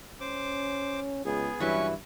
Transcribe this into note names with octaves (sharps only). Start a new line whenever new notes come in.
C#4 C5 D6
C#2 B3 G#4
G2 E3 F#3 C#4 E4 B4 C#6